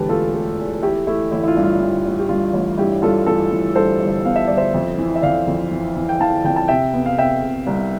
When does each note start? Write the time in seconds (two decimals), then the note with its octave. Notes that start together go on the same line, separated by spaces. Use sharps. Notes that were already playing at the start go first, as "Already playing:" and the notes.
Already playing: E1 E2 D3 G4 B4 A5
0.09 A3 F4 A4
0.34 A3
0.59 E2
0.82 A3 E4 G4
1.07 A3 E4
1.31 A1 E4
1.43 E4
1.48 F4
1.57 G2
1.64 F4
1.80 E3 E4
2.05 A1
2.19 G4
2.29 G2 F4
2.53 A1
2.78 G2 E4 G4
3.02 G2 F4 A4
3.26 E3 F4 A4
3.51 E3
3.75 G2 A4 C5
4.00 G1
4.25 B3 F5
4.36 E5
4.47 G1 D5
4.57 C5 E5
4.74 F2
4.98 E3
5.15 E5
5.22 F2 D5 F5
5.47 F2
5.71 E3
5.96 E3
6.09 G5
6.20 E3 F5 A5
6.44 F2 G5
6.56 A5
6.68 C3 E5 G5
6.93 B3
7.06 F5
7.17 C3 E5 G5
7.43 C3
7.67 C2